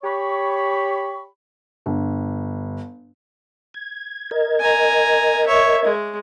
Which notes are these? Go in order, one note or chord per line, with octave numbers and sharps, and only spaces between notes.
G4 C#5 B5 C#6
G1
G#6
A#4 D#5 G#6
G#5 A#5
C#5 E5
G#3